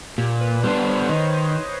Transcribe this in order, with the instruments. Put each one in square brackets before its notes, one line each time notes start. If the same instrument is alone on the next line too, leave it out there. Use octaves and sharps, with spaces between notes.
[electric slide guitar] A#2 [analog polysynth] G4
[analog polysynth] B4
[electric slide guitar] G3 B3 D4 [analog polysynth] C5
[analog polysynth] C#5
[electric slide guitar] D#3 [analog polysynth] D#5